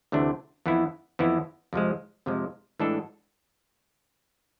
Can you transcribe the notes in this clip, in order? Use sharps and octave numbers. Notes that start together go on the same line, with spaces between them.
D2 C3 E3 A3 D4
F2 E3 B3 E4
F2 E3 B3 E4
F2 C3 F3 G#3
F2 C3 F3 G#3
A2 E3 G#3 D4 A4